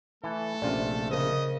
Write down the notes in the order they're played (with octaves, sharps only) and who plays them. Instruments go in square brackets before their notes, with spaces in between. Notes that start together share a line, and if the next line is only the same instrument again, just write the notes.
[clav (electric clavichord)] E3 G#5 [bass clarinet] A3 [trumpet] A4
[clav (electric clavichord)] A#1 C3 F4 [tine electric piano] C#4 D5
[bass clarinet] C#3 [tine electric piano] A#4 C5 [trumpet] D#5